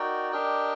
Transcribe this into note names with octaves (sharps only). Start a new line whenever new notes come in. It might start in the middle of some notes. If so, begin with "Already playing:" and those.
Already playing: D#4 F#4 A#4 D5 G5
D4 G4 A#4 D#5 G5